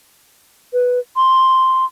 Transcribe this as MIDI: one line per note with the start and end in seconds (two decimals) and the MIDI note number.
0.73 0.99 71
1.16 1.85 84